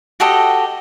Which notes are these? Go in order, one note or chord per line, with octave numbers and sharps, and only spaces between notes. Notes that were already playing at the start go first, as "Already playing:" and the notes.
F#4 G4 A4 D#5